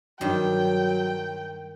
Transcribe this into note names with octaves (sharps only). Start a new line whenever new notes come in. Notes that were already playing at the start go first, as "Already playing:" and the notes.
G2 D#3 F#3 G5